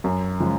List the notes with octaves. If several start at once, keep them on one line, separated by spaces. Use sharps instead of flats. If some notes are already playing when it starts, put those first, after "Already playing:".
F#2
C#3 F3 G#3